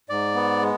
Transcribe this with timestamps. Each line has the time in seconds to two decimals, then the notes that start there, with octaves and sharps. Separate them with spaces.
0.09 G#2 D5
0.35 B3
0.61 G#3